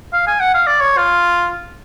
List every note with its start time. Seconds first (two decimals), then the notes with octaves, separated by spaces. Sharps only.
0.13 F5
0.27 G#5
0.40 F#5
0.54 F5
0.67 D5
0.81 C#5
0.97 F4